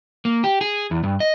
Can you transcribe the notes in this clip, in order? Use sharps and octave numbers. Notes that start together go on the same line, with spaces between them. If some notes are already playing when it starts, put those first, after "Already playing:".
A#3
G4
G#4
E2
G2
D#5